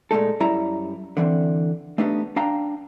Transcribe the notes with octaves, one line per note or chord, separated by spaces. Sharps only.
A#2 G#3 A3 D#4 A4
F#2 G3 E4 E5 A#5
D3 E3 A3 C4
A3 B3 D4 D#4 G4
D4 F5 G5 A#5